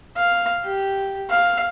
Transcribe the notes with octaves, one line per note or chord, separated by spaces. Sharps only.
F5
G4
F5